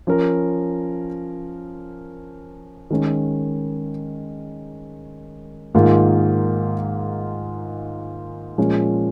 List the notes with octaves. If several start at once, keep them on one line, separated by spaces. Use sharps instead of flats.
F3 C#4 A#4
D#3 G#3 C#4
G#2 D#3 A#3 F4 G#4
A#2 F3 G#3 C#4